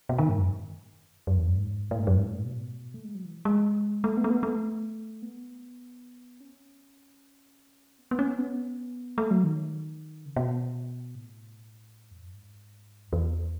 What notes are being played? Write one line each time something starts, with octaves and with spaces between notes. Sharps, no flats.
B2
D#3
G#2
F#2
F#2
E2
F#2
G#2
A2
G#2
F#2
G#2
A2
G#2
A2
B2
A3
G#3
F#3
E3
G#3
A3
B3
A3
B3
A3
B3
C#4
B3
B3
C#4
B3
A3
F#3
D#3
C#3
B2
A2
E2
F#2
G#2
F#2
E2